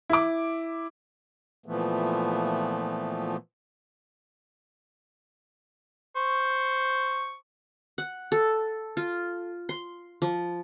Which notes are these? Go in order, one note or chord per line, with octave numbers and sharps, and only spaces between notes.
E4 D6
A#2 E3 F3 A3 B3
C5 C#6
F#5
A4
F4
C6
F3